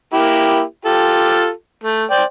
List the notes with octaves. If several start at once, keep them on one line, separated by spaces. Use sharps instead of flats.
A#3 E4 G4
F4 G4 A4
A3
C5 D5 G5